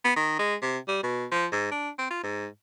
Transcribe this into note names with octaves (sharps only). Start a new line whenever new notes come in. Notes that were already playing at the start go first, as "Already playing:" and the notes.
B3
D#3
G#3
C3
G3
B2
F3
G#2
D4
C4
F4
G#2